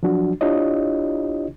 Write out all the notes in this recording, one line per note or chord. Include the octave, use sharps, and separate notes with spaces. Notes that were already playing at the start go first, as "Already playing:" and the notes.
F3 F#3 D4 F#4
D4 E4 F4 G4 C#5 D#5